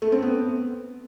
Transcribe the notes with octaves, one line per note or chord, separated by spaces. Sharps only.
A3
C4
B3